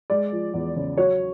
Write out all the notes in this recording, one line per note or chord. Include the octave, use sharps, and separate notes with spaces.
G#3 D5
F3
E2
C#3
F#3 C#5